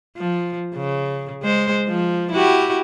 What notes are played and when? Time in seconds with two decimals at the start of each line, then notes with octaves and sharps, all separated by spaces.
0.17 F3
0.75 C#3
1.42 G#3 C5
1.88 F3
2.32 E4 F#4 G4